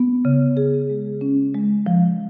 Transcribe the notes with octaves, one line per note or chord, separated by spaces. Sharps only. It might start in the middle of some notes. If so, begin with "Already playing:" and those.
Already playing: B3
C#3
G#4
G#3
C#4
G#3
F3